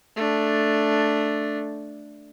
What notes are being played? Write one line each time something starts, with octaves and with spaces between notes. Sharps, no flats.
A3 D4